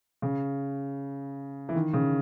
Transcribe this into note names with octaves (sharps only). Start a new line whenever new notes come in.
C#3
E3
D#3
C#3